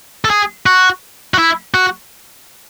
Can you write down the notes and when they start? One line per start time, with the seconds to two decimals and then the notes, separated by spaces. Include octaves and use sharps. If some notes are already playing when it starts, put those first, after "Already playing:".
0.25 A4
0.30 G#4
0.66 F#4
1.34 F#4
1.39 E4
1.74 F#4